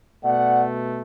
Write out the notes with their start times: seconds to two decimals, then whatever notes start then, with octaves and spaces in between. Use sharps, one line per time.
0.23 B2 A3 D5 F#5